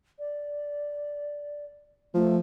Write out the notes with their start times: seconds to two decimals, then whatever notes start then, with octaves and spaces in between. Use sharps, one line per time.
0.19 D5
2.14 F3 A3